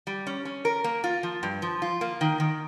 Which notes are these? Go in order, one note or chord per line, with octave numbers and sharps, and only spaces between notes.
G3
C#4
C#4
A#4
A#3
F4
F3
G2
F3
F4
A#3
D#3
D#3